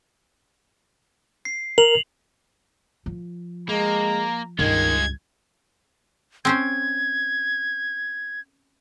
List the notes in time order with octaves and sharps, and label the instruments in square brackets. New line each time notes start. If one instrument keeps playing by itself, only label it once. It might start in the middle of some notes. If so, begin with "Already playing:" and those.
[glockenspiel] C7
[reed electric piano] A#4 [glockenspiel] F7 F#7
[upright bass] F3
[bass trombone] G#3 [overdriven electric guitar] A#3 [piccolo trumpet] A#5
[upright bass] C#2 G2 [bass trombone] D#3 [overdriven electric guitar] G#3 F4 [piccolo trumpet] G#6
[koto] C4 C#4 C5 [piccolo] G#6